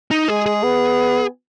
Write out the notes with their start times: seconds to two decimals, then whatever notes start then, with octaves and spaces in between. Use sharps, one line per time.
0.11 D#4
0.28 G#3 G#4
0.46 G#4
0.63 B3